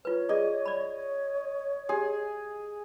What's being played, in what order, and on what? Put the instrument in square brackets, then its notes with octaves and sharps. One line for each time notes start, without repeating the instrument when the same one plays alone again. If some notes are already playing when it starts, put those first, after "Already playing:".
[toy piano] F4 B4 [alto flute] C#5
[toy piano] F4 G#4 D5 [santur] D#5
[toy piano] D5 B5
[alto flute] C#5
[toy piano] G4 [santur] G#4